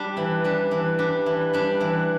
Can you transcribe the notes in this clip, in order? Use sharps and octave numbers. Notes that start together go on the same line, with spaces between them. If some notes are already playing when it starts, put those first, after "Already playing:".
Already playing: G3 D4
E3
G3 D4
E3
G3 D4
E3
G3 D4
E3